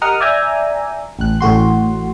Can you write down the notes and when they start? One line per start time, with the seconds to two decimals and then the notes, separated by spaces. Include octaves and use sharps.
0.01 G4 A#4 D#5 F#5 D#6 F6
0.21 D5 E5 G5 G#5 A#5
1.19 A1 F#6
1.40 A1 A2 F#4 C6